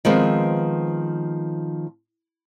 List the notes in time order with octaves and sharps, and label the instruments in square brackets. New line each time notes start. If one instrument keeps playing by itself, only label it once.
[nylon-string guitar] D#3 F3 G#3 B3 C4